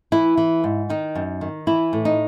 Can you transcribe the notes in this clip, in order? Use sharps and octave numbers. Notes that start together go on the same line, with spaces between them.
E3 E4
E3
G#2
D#3 D#4
F#2
D#3
E3 E4
A2
D#4